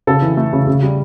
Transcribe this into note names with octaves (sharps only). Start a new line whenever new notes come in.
C#3 A4
E3
A3
C#3
C#3
G3